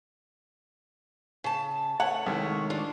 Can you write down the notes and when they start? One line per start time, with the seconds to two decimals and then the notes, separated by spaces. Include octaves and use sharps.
1.44 C#3 A5
2.00 A3 C#5 F#5
2.26 C2 D#3 G#3
2.70 D4 F4